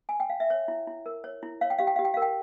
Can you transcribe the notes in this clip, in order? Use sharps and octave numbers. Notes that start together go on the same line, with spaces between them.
G#5
G5
F5
E5
C#5
E4
E4
A#4
C#5
E4
C#5 F5
G5
G4 F5
G5
G4 F5
G5
A#4 F5
G5